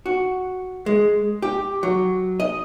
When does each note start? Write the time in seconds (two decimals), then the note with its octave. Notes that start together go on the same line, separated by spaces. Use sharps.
0.06 F#4
0.86 G#3
1.42 G4
1.83 F#3
2.40 D#5